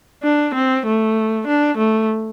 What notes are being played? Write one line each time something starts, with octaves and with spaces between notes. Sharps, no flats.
D4
C4
A3
D4
A3